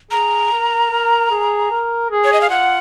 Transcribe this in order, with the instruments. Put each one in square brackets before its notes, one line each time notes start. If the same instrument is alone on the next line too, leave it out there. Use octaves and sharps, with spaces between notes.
[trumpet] G#4 [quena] A#5
[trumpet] A#4
A#4
G#4
A#4
G#4
[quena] C#5
D#5
F5
[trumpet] F4 [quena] F#5